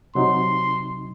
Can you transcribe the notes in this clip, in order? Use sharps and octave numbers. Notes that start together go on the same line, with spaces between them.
C3 F#3 D#4 C6